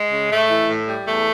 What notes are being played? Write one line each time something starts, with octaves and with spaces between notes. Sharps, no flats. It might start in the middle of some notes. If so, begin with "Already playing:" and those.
Already playing: G#3
C#3
A2 A3
E3
A2
G3
E2 A3